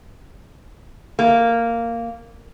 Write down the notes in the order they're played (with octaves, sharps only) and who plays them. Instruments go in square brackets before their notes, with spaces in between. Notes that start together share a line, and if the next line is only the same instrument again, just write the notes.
[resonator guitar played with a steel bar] A#3